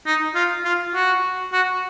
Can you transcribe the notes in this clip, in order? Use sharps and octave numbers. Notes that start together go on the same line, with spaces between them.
D#4
F4
F4
F#4
F#4